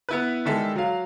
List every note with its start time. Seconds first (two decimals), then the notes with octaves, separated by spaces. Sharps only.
0.09 B3 E4 B4
0.45 D#3 G3 G#3 A4 E5
0.76 F#3 F5